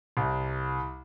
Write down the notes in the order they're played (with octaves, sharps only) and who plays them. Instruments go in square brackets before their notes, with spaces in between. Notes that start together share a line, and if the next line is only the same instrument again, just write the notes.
[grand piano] C2